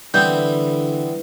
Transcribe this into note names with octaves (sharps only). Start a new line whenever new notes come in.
D3 E3 G3 B3 C4 G6